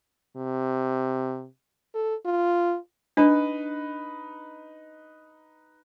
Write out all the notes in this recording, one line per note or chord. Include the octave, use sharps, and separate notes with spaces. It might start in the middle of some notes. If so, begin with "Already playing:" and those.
C3
A4
F4
D4 D#4 B4